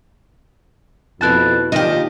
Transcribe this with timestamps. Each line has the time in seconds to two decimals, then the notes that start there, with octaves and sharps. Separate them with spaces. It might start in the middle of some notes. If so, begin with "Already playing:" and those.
1.21 F2 B2 E4 B4 A5 F#6 A6
1.72 A#2 D#3 F3 D4 D#4 G4 D#5